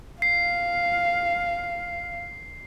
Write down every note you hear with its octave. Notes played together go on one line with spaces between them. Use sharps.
F5 C7